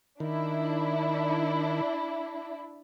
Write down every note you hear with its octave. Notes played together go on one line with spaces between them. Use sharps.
D#3 D4 E4